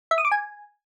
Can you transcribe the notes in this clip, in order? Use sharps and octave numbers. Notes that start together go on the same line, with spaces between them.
E5
D#6
D6
G#5